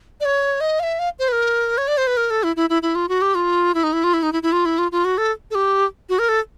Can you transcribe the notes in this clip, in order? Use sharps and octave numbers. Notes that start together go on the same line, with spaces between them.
D5
C#5
D#5
F5
E5
F5
C5
B4
A#4
C#5
D5
C5
B4
A#4
A4
E4
E4
E4
E4
F4
F#4
G4
F4
E4
D#4
E4
F4
E4
D#4
E4
E4
F4
E4
F4
F4
F#4
A4
A4
G4
F#4
A#4
A4